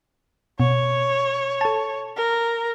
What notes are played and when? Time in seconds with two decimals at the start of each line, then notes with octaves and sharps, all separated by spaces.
0.60 B2 C#5
1.61 A4 A5
2.16 A#4